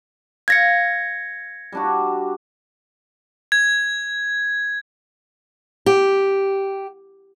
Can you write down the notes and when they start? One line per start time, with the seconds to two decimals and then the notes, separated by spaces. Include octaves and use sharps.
0.48 F5 G#6 A#6 C#7
1.72 G3 D4 F#4
3.52 G#6
5.86 G4